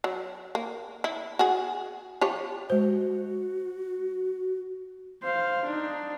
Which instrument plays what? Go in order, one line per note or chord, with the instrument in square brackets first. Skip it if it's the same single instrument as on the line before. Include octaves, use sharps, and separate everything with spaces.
[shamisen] F#3
A#3
E4
F#4 G#4
F3 G4 C#5
[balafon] G#3 C5 [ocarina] F#4
[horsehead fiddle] C5 F5
D4 D#4